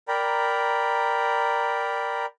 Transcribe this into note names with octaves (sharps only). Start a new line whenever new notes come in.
A#4 D5 G5 A#5 B5